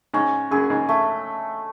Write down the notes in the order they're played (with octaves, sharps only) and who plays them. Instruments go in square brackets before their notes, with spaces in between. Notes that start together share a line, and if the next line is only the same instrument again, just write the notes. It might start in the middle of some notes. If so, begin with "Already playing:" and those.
[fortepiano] G#2 [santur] C#4
[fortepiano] F#2 [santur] G#4
[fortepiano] G#2
[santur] A3